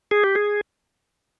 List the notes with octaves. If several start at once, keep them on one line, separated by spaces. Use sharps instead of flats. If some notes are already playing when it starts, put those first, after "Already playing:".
G#4
G4
G#4